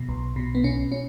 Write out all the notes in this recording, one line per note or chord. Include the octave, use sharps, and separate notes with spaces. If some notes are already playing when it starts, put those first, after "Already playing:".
Already playing: B2
B1
B2
B3
B2 C#4
C#4